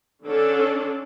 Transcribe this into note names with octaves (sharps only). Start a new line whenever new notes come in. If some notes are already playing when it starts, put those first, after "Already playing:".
D3 C#4 D4 A4